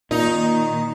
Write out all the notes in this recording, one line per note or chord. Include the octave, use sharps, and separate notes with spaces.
A#2 D#3 A#3 D#4